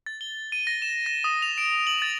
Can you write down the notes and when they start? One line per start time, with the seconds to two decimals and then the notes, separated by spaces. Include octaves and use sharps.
0.06 A6
0.21 G7
0.52 D#7
0.67 A#6
0.82 E7
1.06 A#6
1.24 D#6
1.42 F7
1.58 D7
1.87 F#7
2.02 A6